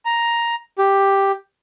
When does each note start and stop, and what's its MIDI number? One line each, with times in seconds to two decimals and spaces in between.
0.05 0.55 82
0.78 1.32 67